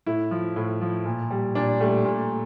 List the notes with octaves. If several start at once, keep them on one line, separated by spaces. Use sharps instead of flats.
A2 E4
F3
A2
F3
A#2
G3
A#2 D4
G3 A3
A#2